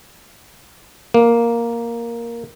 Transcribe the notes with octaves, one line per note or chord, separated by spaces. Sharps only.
A#3